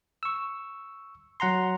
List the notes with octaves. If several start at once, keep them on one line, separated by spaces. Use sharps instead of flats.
C#6 E6
F#3 F#5 A#5 C6